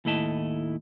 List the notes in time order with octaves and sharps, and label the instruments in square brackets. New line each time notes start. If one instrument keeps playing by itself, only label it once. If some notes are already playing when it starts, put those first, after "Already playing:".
[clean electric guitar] D#2 A2 A3 E4 D#5 A5